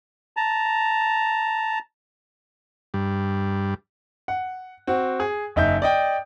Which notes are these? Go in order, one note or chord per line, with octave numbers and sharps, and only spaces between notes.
A5 A#5
G2
F#5
C4 F#4
G#4
F#1 D#4 E5 G6
D5 D#5 G5